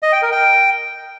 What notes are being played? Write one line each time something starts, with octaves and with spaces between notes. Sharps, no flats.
D#5
G5
A#4
G5